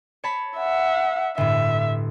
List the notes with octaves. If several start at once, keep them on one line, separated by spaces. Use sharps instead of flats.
C#5 A5 B5
E5 F#5
G1 A2 E5